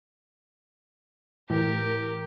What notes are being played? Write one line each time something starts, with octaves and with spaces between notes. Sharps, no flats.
A2 E3 G4 A#4